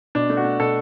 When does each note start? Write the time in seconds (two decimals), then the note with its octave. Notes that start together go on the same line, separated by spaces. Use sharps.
0.15 B2 D4
0.30 A3
0.37 F#4
0.44 A3
0.60 B2 A4